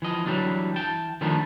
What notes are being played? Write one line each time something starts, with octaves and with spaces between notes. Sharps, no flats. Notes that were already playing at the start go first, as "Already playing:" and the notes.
E3 F3 D#5
D3 E3 F#3 G3 A#3 D4
E3 G5 A5
D#3 F3 G3 A3 D4